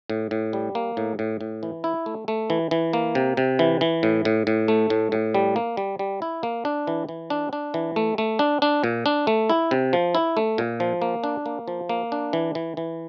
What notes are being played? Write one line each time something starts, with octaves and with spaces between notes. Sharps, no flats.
A2
A2
G3
A#3
A2
A2
A2
E3
E4
A3
A3
E3
E3
A#3
C3
C3
E3
E3
A2
A2
A2
A3
A2
A2
G3
A#3
G3
G3
E4
A#3
D4
E3
E3
D4
D4
E3
A3
A3
D4
D4
A#2
D4
A3
E4
C3
F3
E4
A3
A#2
F3
A#3
D4
A#3
F3
A#3
D4
E3
E3
E3